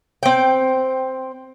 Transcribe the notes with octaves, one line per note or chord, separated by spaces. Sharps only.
C4 G5